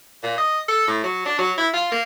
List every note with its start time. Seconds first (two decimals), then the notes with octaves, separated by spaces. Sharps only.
0.23 A#2
0.38 D#5
0.68 A4
0.87 A2
1.04 F#3
1.25 D4
1.39 F#3
1.58 E4
1.73 F4
1.92 A#3